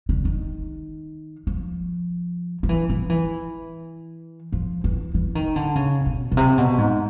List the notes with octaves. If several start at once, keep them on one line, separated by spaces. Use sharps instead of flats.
D3
D#3
F3
F3
E3
F3
E3
F3
E3
E3
D#3
D3
C#3
B2
B2
C3
B2
G#2